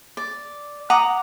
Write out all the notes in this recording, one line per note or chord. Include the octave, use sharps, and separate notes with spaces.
D5
F#5 A#5 D6 D#6